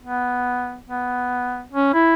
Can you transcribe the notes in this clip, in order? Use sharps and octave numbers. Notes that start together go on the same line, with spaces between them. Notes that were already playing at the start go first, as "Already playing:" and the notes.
B3
B3
C#4
E4